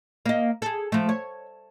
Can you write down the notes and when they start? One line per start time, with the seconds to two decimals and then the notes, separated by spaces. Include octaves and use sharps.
0.26 A#3 D#5
0.62 G#4 A4
0.92 F3 A3
1.09 C#5